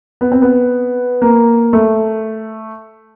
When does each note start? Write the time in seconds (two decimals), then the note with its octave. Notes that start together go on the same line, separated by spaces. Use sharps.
0.21 B3
0.32 C4
0.42 B3
1.22 A#3
1.73 A3